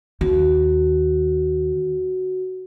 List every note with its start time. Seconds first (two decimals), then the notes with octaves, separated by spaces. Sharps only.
0.21 D#2 F#4